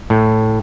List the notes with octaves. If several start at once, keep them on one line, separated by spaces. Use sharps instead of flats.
A2